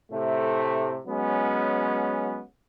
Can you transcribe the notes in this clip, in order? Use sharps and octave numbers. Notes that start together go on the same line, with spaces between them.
A2 C3 A3
F#3 G#3 B3 C#4